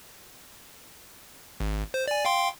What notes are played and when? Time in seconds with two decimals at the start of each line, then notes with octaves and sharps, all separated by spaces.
1.60 G#1
1.94 C5
2.08 D5 G#5
2.25 F5 G5 C6